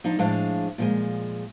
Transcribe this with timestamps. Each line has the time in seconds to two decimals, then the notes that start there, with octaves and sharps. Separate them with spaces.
0.04 F3 D4 D#4
0.19 A2 F3 G#3 D4 F5
0.78 A#2 F3 G#3